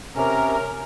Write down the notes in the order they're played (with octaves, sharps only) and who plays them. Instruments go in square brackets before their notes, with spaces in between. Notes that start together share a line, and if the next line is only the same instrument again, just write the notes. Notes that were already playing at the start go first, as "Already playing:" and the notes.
[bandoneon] C3 C#4 [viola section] A#4